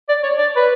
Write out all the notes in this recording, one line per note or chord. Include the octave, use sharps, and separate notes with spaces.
D5
C#5
D5
B4